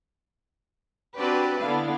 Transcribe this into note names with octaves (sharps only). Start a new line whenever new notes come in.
C4 D4 F#4 G4 B4 D5
D3 B3 D4 E4 F5